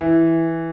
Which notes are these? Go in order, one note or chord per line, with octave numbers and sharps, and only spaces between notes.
E3